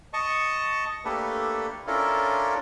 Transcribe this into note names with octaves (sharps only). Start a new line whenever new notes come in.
D#5 A5 C#6
A3 A#3 D4 G4 A4 B4
C#4 D4 E4 F4 A4 A#4